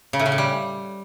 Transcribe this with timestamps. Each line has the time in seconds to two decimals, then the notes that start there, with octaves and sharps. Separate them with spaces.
0.13 C#3
0.19 A2
0.26 C#3
0.32 A2
0.38 G3